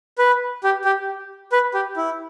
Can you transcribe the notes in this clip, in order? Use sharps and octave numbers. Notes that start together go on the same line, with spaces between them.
B4
G4
G4
B4
G4
E4